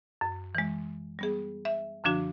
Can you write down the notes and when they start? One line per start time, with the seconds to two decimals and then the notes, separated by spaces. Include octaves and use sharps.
0.21 F#2
0.55 E3 G#3
1.19 G3 B3 G#4
1.65 E5
2.04 F#2 D3 F3 D4 F#4